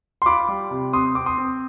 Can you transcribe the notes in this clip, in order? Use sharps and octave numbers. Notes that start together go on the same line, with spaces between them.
C6
F4 B5 D6
G3
C3
C4 C6 D#6
C4 D6
C6 D#6
C4